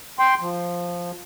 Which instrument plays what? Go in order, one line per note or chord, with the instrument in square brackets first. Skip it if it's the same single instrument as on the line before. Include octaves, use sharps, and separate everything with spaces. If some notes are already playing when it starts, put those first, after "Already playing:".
[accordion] G5 C6
F3